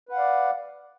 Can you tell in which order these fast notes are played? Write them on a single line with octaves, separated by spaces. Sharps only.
B4 F#5 F5 D5